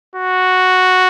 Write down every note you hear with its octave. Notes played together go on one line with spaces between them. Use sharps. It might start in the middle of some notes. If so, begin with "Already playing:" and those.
F#4